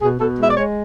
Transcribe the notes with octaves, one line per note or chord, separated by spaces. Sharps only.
B2 G#4
B2 A4
G#3 E5
D5
G#3 C#5